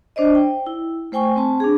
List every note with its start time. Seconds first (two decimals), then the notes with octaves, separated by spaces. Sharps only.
0.16 D4 C5 D5 D#5
0.35 G5
0.67 E4
1.12 A3 C5 G5 G#5 C#6
1.36 C4 A5
1.60 D4 G#4